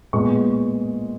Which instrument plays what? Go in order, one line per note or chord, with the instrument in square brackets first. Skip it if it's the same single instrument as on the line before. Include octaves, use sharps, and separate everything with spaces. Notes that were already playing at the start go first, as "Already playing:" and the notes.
[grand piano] A#2 G#3 B3 C#6